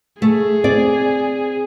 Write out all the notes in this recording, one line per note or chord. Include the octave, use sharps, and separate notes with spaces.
A3 G#4
C4 D5